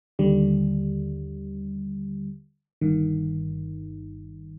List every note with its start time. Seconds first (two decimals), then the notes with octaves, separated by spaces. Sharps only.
0.19 D#2 D3 G3
2.81 G1 G2 D#3